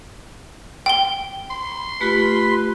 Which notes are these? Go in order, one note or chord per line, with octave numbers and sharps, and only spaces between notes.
G5 G7
C6
A3 F4 G4 B4 B5